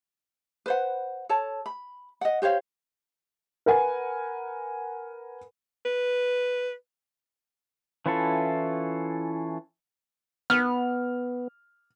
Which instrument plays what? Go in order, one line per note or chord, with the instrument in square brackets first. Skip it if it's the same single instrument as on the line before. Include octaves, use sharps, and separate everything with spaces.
[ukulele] B4 C5 F#5
A4 C#5 A5
B5
D#5 F#5
G4 C5 C#5 F5
[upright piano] A#4 B4 F#5 G#5
[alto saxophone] B4
[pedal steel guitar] E3 C#4 E4 F4 A4
[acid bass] B3 [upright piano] F6